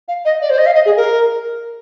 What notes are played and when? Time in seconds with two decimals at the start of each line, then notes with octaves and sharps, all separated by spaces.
0.08 F5
0.25 D#5
0.42 D5
0.50 C5
0.58 D#5
0.66 F5
0.75 D#5
0.86 G#4
0.97 A#4